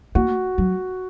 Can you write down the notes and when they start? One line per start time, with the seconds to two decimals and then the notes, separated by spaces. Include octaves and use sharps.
0.15 A#3 F#4
0.58 F#3